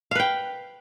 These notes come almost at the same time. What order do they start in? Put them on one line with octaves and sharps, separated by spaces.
F5 B4 G5